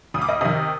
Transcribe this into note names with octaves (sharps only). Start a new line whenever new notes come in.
D2 D#6
D6
D#5 D#6
C3 D#3 D#5 D#6